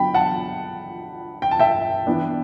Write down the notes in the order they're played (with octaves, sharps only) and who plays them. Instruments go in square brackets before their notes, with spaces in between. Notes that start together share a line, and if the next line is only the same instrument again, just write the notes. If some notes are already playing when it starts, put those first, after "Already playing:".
Already playing: [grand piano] D3 F#3 B3 G5 B5
F#5 A5
G5
A5
E5 G5
E3 B3 D4